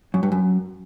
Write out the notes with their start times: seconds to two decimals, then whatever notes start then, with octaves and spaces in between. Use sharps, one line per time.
0.14 F#2
0.23 G2
0.32 F#2